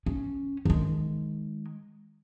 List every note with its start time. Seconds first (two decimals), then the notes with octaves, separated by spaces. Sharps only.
0.06 C#4
0.65 D#3 G#3